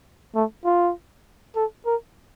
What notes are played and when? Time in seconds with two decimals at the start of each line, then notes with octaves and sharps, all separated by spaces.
0.35 A3
0.65 F4
1.56 A4
1.86 A#4